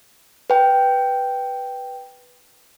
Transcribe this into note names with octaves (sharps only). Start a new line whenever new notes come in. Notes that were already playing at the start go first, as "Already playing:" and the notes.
B4 G5